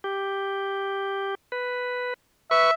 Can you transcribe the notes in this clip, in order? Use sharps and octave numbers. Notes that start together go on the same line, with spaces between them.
G4
B4
B4 E5 C#6